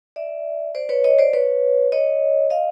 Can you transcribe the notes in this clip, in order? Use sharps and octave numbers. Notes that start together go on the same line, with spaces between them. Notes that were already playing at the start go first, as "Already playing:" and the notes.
D5 E5
C5 D5
B4 C#5
C#5 D#5
C5 D5
B4 C#5
C#5 D#5
D#5 F5